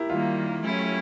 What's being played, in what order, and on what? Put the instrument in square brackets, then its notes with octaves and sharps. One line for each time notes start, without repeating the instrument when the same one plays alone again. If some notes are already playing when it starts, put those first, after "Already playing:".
Already playing: [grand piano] E4 G4 A#4
[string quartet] D#3 G3 A#3 [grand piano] F4
[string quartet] F#3 A3 C#4 E4